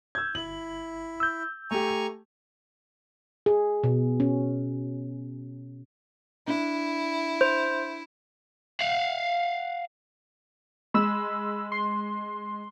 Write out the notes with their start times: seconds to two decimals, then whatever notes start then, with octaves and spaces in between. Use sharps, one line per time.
0.15 E6 G6 G#6
0.35 G1 E4 F#7
1.20 E6 G6
1.71 A3 G4 G#5 A#5 C#6
3.46 G#4
3.83 B2
4.20 C#4
6.47 D4 E4
7.41 C5
8.81 F5 F#5
10.94 G#3 B5 E6
11.72 C6